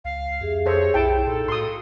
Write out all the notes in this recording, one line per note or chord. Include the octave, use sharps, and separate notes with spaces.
C#2 F5
F2 G4 G#4 E5
A4 C5 C#5
B1 E4 G5 A5
A#2 D#4 A4 A#5 C6
A2 F#4 F5 C6 D#6